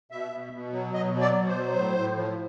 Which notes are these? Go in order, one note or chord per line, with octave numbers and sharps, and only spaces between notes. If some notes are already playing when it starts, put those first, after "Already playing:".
B2 E5
B2
B2
F#3
B2 D#5
F#3
D5
B2
C5
F#3
A2
A2
F3